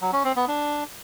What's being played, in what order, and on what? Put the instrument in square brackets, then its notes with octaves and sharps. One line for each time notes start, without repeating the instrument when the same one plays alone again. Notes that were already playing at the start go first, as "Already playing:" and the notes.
[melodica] F#3
C#4
C4
B3
D4